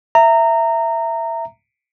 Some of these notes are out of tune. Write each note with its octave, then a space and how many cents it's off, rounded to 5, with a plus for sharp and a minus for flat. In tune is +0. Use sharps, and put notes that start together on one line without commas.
E5 +5 A#5 -20